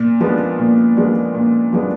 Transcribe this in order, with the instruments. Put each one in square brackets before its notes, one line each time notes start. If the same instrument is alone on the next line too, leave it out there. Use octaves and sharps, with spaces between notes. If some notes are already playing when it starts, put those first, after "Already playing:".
Already playing: [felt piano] A#2
F3 G#3 B3 D4
A#2
F3 G#3 B3 D4
A#2
F3 G#3 B3 D4